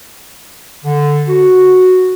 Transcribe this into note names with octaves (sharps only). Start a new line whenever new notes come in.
D3
F#4